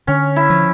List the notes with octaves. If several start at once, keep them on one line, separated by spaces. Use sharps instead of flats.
D3 C#4
E4
F3